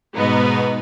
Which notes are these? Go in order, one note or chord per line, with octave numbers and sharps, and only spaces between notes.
G#2 B2 B3 D#4